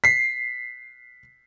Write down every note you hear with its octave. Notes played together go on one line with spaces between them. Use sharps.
B6 C7